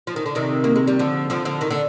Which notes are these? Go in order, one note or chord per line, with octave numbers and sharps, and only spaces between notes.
F3
D#3
D3
C3 D#3
A#3
G#3
G3
D3 F3
D3 F3
D3 F3
D#3
D3